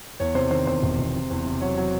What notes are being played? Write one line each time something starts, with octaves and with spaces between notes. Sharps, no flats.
E2 C#5
C3 C5
D#3 C5
E2 C5
E1
E1
C3
E2
C3
F#3 C#5
F#3